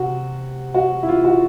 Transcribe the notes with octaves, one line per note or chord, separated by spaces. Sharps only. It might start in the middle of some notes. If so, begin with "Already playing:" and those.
Already playing: C3 F#4
F#4
E4
F4
F#4